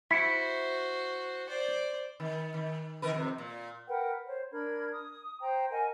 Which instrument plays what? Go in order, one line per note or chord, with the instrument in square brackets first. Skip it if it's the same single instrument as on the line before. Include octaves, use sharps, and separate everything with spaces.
[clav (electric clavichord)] E4 [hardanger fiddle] F#4 C5 [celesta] B6 C#7
[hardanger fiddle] C5 D5
[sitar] D#3
D#3
D#3 A#4 B4
F2 C3
A#2
[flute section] A#4 B4 F#5 G5
C5 C#5
D4 A#4 B5 G#6
D#6
C5 G5 A#5
A#4 D#5 F#5 G#5